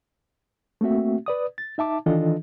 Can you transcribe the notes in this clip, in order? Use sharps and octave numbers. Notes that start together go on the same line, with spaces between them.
A3 A#3 C4 F#4 E5
B4 D5 D#6
A6
D#4 E5 A5 D6
D#3 E3 D4 F4 A4 D#5